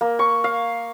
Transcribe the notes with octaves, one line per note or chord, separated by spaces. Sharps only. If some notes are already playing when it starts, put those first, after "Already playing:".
A#3
C#6
F5